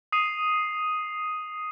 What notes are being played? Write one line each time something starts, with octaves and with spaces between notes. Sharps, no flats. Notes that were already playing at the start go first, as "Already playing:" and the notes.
D#6 C7 D#7 F7